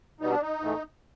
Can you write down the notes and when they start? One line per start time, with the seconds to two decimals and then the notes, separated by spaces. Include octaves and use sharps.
0.20 B2 G3 B3 D#4
0.31 D4
0.41 D#4
0.60 G#2 E3 A3